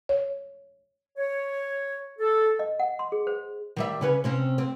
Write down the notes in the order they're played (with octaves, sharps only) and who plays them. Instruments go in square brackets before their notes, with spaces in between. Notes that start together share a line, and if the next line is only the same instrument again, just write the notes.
[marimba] C#5
[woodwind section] C#5
A4
[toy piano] D#5
F#5
C6
G#4
C5
[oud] D#3 G3 E5
C#3 C#4 B4
C3 C4 C#4
C4